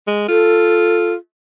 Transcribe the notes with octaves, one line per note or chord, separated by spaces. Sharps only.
G#3
F4 A4